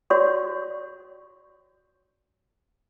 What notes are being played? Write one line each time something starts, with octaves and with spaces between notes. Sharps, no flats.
F#4 C#5 D5 C6 C#6